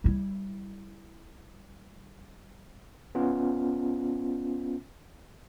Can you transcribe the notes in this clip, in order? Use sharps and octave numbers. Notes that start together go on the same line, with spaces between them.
G3 E4
B3 C#4 F4